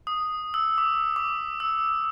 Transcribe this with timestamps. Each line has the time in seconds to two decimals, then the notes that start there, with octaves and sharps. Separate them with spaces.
0.07 D#6
0.54 E6
0.78 D6
1.16 D6
1.60 E6